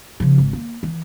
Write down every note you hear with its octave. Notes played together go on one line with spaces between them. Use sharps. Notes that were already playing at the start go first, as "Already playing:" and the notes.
C#3 F3
G#1
A#3
E3